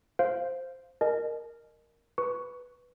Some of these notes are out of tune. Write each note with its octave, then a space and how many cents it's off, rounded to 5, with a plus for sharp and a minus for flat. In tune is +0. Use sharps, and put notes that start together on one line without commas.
C5 +0 F5 +0
A#4 +0 D#5 -25 G#5 +45
B4 +0 C#6 +15